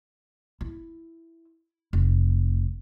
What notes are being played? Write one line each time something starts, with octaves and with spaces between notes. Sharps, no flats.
E4
F1